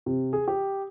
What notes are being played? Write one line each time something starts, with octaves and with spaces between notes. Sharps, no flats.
C3
G#4
G4